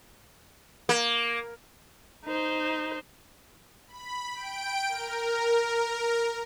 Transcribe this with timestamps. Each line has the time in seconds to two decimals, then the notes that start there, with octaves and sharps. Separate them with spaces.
0.89 A#3
2.25 D#4 C5
3.88 B5
4.33 G5 D7
4.89 A#4